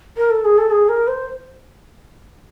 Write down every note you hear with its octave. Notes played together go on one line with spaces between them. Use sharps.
A#4
A4
G#4
A4
G#4
A#4
C5